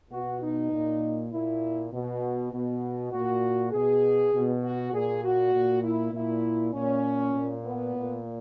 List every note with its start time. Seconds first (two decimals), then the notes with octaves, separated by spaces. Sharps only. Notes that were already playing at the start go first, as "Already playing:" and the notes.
0.10 B2 F#4
0.42 D#4
0.71 A#2
1.32 A#2 E4
1.92 B2
2.53 B2
3.12 A#2 F#4
3.72 B2 G#4
4.33 B2
4.64 F#4
4.93 A#2 G#4
5.24 F#4
5.54 A#2
5.83 E4
6.13 A#2 E4
6.74 A#2 C#4
7.34 A#2
7.64 B3
7.95 A#2